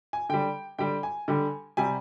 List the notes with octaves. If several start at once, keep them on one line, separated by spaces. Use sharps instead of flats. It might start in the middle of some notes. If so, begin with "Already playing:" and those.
G#5
D3 G3 G5
D3 G3 G5
G#5
D3 G3
C3 G3 G#5